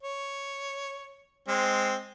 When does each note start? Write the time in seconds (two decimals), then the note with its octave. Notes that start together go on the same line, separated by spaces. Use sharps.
0.03 C#5
1.48 G#3 C4